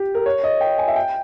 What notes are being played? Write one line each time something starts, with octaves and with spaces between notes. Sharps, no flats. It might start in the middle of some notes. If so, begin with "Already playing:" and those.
Already playing: G4
A#4
C#5
D#5
G5
G#5
E5
G5